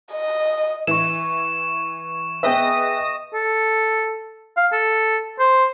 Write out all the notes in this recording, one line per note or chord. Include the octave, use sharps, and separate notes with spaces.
D#5
E3 C#6 E7
B3 G#4 B4 D#5 E5 G5 D#6 A#6
A4
F5
A4
C5